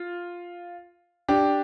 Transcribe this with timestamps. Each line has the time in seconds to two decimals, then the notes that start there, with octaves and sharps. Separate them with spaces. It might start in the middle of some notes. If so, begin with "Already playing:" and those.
Already playing: F4
1.28 D4 G4